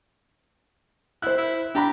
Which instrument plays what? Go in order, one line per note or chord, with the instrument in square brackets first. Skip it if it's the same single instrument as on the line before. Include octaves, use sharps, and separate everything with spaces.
[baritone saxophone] E4 [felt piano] C5 F#6
[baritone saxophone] E4
[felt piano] D4 A#5 B5 [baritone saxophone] G4